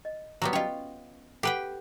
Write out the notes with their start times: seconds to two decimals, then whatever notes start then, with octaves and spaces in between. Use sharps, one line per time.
0.05 D#5
0.42 F#3 G3 B3
0.53 C#4 F4 C#5 D#5
1.43 G4 A4 B4 F#5 G5